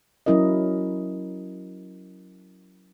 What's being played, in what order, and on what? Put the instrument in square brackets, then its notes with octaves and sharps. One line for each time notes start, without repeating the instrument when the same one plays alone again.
[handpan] F#3 C#4 E4 A#4 D#5